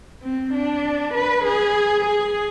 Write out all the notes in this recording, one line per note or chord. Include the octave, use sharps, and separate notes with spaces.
C4
D4
B4
G#4
G#4